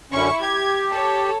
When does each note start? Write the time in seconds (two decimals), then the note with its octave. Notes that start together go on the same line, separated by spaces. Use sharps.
0.12 F#2 D3 C#4 E4 C#6
0.41 G4 G#6
0.89 A4 C#5